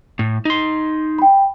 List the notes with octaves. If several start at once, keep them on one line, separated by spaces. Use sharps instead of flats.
A2
D#4 C6
G5 B5